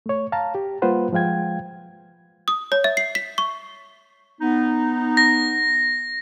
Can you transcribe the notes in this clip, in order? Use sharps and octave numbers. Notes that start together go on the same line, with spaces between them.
A3 C#5
F5 A5 A#5
G4
G3 A#3 F4 B4 C5 F#5
F3 G#3 F5 G5 G#6
D#6
C#5
E5
C7
B6
C#6
B3 D#4
A#6